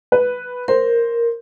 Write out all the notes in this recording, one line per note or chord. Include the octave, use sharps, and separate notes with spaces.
B4
A#4 C5